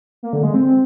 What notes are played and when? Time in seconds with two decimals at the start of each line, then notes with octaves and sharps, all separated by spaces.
0.23 A#3
0.33 D3
0.43 G#3
0.54 C4